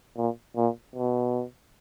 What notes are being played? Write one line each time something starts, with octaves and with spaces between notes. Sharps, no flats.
A#2
A#2
B2